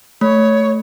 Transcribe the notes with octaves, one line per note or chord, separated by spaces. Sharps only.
A3 C#5